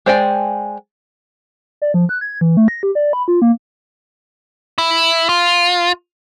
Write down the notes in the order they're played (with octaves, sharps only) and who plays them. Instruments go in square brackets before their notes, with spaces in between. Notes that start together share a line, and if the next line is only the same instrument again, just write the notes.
[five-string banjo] G#3 C5 D5 G5 G#5
[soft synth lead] D5
F3
F#6
G#6
E3
A3
A#6
G4
D5
B5
F4
A#3
[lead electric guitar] E4
F4